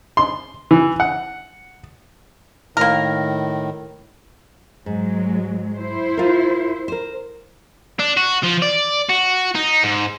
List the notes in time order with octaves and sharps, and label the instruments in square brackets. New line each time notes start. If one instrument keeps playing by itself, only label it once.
[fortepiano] C6
E3
F#5
[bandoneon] A2 D#3 [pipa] A#3 A#4
[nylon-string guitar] G#2 [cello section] F#3 G#3
[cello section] E4 C5
[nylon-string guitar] F4 A#4
A#4 C5
[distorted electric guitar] D4
F#4
F3
D5
F#4
D#4
G#2